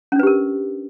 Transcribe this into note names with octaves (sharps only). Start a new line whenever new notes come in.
C#4 D4 G4 A#4 B4